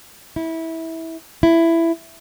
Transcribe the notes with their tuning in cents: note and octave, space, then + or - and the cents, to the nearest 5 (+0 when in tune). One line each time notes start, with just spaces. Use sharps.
E4 -20
E4 +10